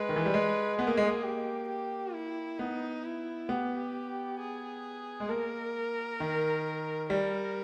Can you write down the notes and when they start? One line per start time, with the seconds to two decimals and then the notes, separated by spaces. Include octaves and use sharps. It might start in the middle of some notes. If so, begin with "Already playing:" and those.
Already playing: G#3 B4
0.09 D#3
0.16 E3
0.26 G3
0.34 G#3
0.78 B3 G#4
0.87 A#3
0.97 G#3
1.07 A#3
1.24 G4
1.69 G4
2.13 E4
2.58 B3 D#4
3.04 E4
3.49 B3 G4
4.39 G#4
5.20 G#3
5.29 A#3 A#4
6.20 D#3
7.10 G3 A#4